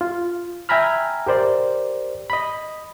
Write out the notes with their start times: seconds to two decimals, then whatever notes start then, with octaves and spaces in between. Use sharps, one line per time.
0.01 F4
0.69 E5 G5 G#5 A#5 B5 F6
1.27 G4 A#4 C5 D5
2.30 D#5 B5